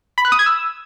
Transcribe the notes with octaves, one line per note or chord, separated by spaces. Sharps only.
B5
F#6
D#6
G#6
E6